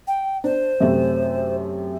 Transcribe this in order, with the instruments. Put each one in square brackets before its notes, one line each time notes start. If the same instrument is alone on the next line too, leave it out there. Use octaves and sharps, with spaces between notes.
[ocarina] G5
[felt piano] D4 [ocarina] C5
[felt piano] F#2 C3 A3